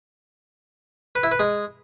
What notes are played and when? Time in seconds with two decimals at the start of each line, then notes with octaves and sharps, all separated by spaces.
1.15 B4
1.23 E4
1.32 B4
1.40 G#3